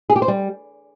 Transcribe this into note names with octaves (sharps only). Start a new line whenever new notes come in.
G#4
G4
C5
G3